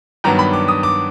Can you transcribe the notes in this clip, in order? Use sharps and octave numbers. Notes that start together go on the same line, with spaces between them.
G2 D#3 F#3 B3 D4 A#5
B5
D6
D#6
D6